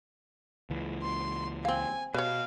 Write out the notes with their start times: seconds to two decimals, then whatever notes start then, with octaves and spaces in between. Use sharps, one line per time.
0.70 C#2 E3
1.03 C6
1.65 C4 F5 G#5
2.14 B2 B4 C#5 F5